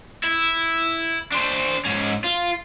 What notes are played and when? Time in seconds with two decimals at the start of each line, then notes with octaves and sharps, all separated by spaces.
0.24 E4
1.32 D4 C5
1.85 G#2 C#4
2.24 F4